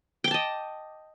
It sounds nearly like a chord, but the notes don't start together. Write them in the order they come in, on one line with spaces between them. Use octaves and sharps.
G5 D6 A5 D#5